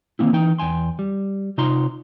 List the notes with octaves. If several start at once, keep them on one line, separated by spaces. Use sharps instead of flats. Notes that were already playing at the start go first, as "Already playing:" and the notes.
D#3 A#3 C4 E4
E3 D#4 G5
E2 G5 G#5 C6
G3
C3 D#4 F4 A#5 C6